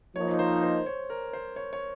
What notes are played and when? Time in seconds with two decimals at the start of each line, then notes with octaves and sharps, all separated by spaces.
0.15 F3 A#3 D#4 C#5
0.39 C5
0.63 C5
0.86 C#5
1.10 A#4
1.33 C5
1.56 C#5
1.73 C#5